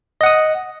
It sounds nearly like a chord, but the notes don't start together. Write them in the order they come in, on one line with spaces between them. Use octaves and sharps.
D#5 F#5 D#6